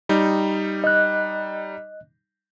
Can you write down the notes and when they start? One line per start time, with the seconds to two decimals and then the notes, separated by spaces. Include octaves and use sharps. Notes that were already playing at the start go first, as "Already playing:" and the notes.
0.09 G3 D#4
0.84 D#5 F#6